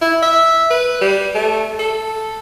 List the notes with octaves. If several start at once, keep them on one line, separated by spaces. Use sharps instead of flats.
E4
E5
B4
G3
A3
A4